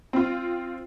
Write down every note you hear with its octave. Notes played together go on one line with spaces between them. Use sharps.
C4 F4